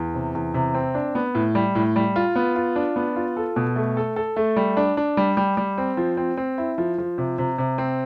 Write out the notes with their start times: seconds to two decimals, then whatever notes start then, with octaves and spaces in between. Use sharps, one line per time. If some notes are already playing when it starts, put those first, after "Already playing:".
Already playing: E2
0.15 C3
0.35 E2
0.54 C3
0.74 C4
0.95 D4
1.15 B3
1.35 A2
1.55 G3
1.75 A2
1.96 G3
2.16 F4
2.36 B3
2.56 F4
2.76 D4
2.96 B3
3.16 F4
3.37 A4
3.56 B2
3.76 A3
3.97 A4
4.16 A4
4.36 A3
4.56 G3
4.77 D4
4.97 D4
5.17 G3
5.37 G3
5.57 G3
5.78 C4
5.97 F3
6.17 C4
6.37 C4
6.58 E4
6.78 F3
6.98 F3
7.18 C3
7.38 C3
7.58 C3
7.78 C4